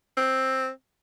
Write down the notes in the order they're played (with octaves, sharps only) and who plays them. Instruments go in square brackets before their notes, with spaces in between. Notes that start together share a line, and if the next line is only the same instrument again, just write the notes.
[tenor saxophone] C4